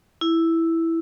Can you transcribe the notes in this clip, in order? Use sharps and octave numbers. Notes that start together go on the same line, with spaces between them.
E4